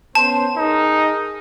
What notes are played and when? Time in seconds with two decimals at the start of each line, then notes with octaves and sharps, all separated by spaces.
0.15 B3 C#4 C5 A5
0.57 D#4 G#4 A#4